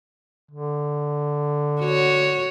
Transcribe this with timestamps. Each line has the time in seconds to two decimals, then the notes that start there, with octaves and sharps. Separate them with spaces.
0.51 D3
1.81 F#4 C#5